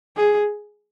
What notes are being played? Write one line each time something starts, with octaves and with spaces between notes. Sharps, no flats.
G#4